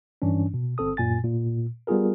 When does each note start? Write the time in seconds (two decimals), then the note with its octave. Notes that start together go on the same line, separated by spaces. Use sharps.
0.22 G2 E3 C#4 D4
0.54 B2
0.78 G1 C4 A4 D#6
0.97 F#2 A#2 G#5 A6
1.24 A#2
1.87 G3 B3 F4 G#4 A#4